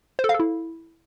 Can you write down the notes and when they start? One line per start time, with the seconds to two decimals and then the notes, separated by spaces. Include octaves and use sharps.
0.19 C5
0.24 A4
0.29 F5
0.34 A4
0.40 E4